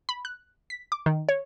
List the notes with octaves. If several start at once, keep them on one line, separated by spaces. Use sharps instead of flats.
B5
F#6
B6
D6
D#3
C#5